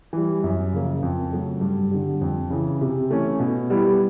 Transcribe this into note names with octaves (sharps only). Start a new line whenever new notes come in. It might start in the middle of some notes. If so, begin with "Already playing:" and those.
E3 G3
F#2
C#3 F3 A#3
F2
C#3 F#3 A3
G2
D3 G3
F2
C#3 E3
C3
E3 A3 C#4
B2
G3 B3 E4